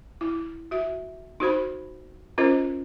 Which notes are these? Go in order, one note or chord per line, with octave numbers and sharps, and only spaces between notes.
E4
F#4 E5
D#4 F#4 C5 B5
C#4 F4 A#4 C5 D#5